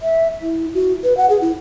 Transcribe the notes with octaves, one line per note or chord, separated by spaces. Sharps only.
E5
E4
F#4
B4
F#5
G#4
E4